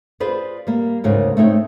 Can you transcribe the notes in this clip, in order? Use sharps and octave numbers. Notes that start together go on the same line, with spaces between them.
F4 G#4 B4 C5 D5
G3 A#3
D2 G#2 C#3 D#4 A#4
A3 C4 D#4 C#5